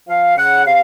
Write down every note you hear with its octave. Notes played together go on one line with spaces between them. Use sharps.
F3 F5
C#3 F#5
C3 F5